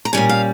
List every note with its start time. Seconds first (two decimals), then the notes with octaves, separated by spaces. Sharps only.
0.05 A#5
0.13 A#2 G3 C#4 G#5
0.29 F5